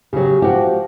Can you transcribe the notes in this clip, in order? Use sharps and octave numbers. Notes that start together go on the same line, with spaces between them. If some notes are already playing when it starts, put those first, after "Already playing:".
C#3 F#3 G4
F3 F#4 G4